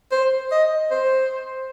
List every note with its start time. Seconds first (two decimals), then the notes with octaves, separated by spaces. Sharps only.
0.12 C5
0.52 D#5
0.91 C5